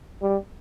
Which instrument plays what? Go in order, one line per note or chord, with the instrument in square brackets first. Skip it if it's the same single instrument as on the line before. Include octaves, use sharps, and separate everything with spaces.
[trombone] G3